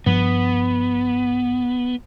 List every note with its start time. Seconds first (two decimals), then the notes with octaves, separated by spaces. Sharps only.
0.06 G2 F3 B3